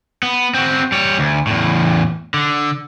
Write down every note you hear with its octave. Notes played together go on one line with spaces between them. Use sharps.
B3
C4 F#4
G3 C#5
D2
E2 A2
D3